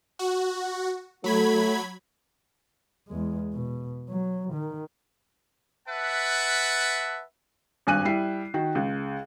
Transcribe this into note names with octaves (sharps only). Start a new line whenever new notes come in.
F#4
F#3 A3 B5 G#6
E2 G#3
B2
F#3
D#3
B4 E5 F#5 A5
G#1 G2 G#5 F#6 D#7
G3 E4 C7
D#3 F#4
C#2